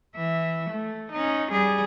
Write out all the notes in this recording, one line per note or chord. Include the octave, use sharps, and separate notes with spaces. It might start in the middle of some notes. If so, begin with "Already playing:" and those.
E3 E5
A3
C#4 D#4
G3 G#4